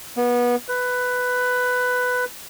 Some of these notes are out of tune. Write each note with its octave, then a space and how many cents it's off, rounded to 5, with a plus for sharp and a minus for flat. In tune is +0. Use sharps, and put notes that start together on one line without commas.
B3 -25
B4 +10